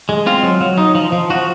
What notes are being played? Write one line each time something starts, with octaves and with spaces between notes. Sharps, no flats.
G#3
C4 F4
F#3
F#3
D#4
F3
F3
F3 F#4